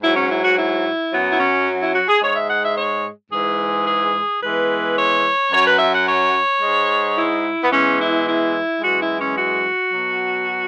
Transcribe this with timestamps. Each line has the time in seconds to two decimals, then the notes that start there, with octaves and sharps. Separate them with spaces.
0.02 G#2 F#3 E4
0.16 C#4
0.29 E4
0.43 F#4
0.57 E4
1.12 F#2 F#3 B3
1.30 E4
1.39 C#4
1.80 E4
1.94 F#4
2.08 G#4
2.22 G#2 G#3 C#5
2.36 E5
2.49 F#5
2.63 E5
2.77 C#5
3.32 G#2 E3 G#3 G#4
3.87 G#4
4.41 E2 E3 G#3 B4
4.96 C#5
5.52 F#2 F#3 C#5
5.65 B4
5.79 E5
5.93 F#5
6.07 C#5
6.62 G#2 G#3
7.16 E4
7.63 B3
7.71 E2 E3 G#3 C#4
7.99 E4
8.26 E4
8.81 F#2 E3 G#3 F#4
9.00 E4
9.18 C#4
9.36 F#4
9.91 B2 F#3